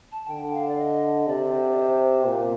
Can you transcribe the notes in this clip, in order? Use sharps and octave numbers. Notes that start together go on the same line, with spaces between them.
A5
D3 G5
F5
D5
D#5
C3 D5
C5
D5
C5
A#2